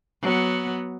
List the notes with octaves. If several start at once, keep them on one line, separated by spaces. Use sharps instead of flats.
F#3 B3